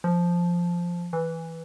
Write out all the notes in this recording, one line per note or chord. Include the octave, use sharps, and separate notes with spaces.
F3
E3